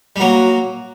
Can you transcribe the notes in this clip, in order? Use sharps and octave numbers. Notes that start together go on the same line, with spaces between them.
G3
F#3 A#3 F#4